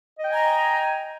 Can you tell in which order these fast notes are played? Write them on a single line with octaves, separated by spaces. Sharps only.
D#5 G5 G#5 A#5